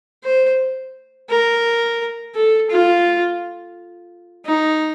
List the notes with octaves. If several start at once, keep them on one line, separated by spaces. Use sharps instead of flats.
C5
A#4
A4
F4
D#4